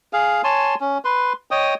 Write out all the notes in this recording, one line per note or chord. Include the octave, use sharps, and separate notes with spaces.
G#4 F5
C#5 G#5 A5 C6
C#4
B4 C6
C#5 D#5 G5 D#6